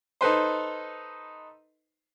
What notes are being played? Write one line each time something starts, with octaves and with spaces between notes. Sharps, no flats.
D#4 A4 B4 C5